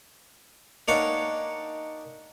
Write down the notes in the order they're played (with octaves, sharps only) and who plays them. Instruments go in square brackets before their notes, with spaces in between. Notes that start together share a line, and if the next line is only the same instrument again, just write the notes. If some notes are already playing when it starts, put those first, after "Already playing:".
[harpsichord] A#3 D4 D#4 C#5 F5 F#5